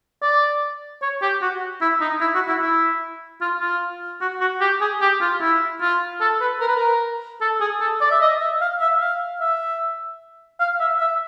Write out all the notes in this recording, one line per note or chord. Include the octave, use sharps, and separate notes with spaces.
D5
C#5
G4
F#4
E4
D#4
E4
F#4
E4
E4
F4
F4
F#4
F#4
G4
G#4
G4
F4
E4
F4
A4
B4
A#4
B4
A#4
A4
G#4
A4
D5
E5
D#5
E5
F5
E5
F5
E5
F5
E5
E5